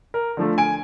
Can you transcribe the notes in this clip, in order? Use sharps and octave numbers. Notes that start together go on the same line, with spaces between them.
A#4
D3 F3 A3
G#5 D7